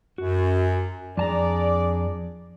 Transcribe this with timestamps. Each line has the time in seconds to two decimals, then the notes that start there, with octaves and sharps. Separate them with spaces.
0.18 F#2 F#4
1.17 F2 D4 G#4 D5 A5 A#5